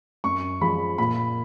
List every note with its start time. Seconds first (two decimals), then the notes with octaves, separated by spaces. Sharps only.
0.24 F#2 C#6
0.61 F3 G#3 B5
0.98 A#2 B5